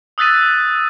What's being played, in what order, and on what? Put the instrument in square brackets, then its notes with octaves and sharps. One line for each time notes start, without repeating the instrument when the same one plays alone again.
[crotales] D#6 E6 F#6 A6 B6 D#7